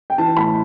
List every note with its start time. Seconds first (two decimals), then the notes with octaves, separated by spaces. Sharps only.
0.10 G5
0.18 E3 A5
0.36 A2 B5